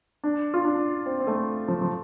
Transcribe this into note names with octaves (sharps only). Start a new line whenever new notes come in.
D4
F4
D4
C4
C4
A3
F3
F3